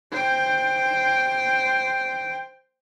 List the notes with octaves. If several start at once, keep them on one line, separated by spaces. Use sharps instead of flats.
C5 G5